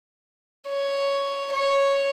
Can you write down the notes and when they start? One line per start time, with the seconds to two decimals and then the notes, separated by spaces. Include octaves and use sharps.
0.69 C#5
1.53 C#5